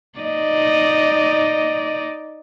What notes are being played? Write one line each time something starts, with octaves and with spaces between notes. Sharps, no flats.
D#4 D5 D#5